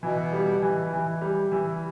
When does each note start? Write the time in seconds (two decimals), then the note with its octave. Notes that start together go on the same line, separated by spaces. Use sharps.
0.02 B2 E3
0.33 G3
0.62 E3
0.93 E3
1.21 G3
1.52 E3